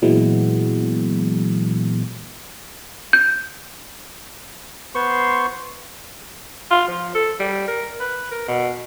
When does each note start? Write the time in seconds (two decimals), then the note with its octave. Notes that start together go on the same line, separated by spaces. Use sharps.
0.02 A#2 E3 F#3 G#3 B3
3.13 G6
4.95 B3 C5 C6 C#6
6.71 F4
6.88 F3
7.15 A4
7.40 G3
7.68 A#4
8.00 B4
8.31 A#4
8.48 B2